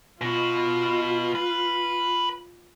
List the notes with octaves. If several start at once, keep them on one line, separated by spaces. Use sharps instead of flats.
B2 F4 F#4
B4